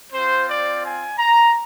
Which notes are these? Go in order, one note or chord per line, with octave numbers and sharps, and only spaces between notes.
C4 F4 C5
D5
G#5
A#5